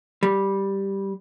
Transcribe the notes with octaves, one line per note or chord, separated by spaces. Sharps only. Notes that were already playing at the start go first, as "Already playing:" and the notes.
G3